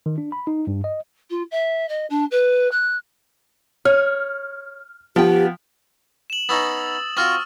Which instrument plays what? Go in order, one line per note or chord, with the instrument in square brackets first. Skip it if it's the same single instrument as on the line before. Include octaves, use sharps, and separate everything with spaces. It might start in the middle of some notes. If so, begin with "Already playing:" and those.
[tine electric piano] D#3
D4
B5
D#4
G2
D#5
[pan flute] F4
E5
D#5
D4
B4
F#6
[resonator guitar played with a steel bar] C#5 [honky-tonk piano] F6
[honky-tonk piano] F3 [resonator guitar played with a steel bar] B3 G5 [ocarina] G4
[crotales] E7 F#7
[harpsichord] B3 C#4 D#4 [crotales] D#6 E6 A6
[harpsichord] C4 F4 F#4 [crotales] C#6 F6